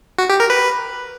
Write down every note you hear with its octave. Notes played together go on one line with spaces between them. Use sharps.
F#4
G4
A#4
B4